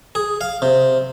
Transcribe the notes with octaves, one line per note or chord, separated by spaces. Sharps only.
G#4
F5
C3